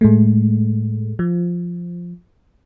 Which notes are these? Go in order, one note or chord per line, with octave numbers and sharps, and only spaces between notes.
A2 G#3 A3
F3